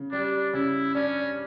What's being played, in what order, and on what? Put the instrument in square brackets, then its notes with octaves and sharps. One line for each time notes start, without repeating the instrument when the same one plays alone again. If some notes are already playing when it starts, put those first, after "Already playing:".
Already playing: [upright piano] C#3
[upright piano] G3 [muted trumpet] D4
[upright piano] C#3 [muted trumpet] E4
[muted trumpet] C#4 [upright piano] D4